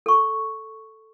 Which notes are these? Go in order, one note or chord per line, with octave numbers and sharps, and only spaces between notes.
A4 C#6